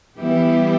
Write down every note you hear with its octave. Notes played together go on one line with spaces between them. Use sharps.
E3 G3 B3 E4 G4